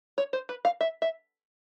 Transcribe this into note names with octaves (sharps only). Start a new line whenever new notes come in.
C#5
C5
B4
F5
E5
E5